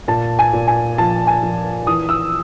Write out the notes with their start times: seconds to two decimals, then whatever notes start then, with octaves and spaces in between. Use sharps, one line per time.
0.08 A#2 A5
0.39 G#5
0.53 A#2
0.67 G#5
0.98 F3 A5
1.27 G#5
1.42 F3
1.87 E3 D#6
2.09 E6